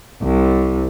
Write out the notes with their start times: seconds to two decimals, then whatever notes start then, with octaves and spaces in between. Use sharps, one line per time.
0.22 C2